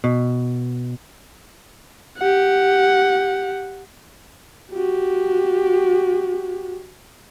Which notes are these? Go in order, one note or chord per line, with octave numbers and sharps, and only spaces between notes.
B2
G4 F#5
F#4 G4